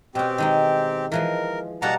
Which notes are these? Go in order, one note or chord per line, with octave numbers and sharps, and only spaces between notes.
B2 C4 C#4 G4
D#3 G#3 D#4
E3 F3 G#3 A#4
B2 G3 A#3 F#5 A5 A#5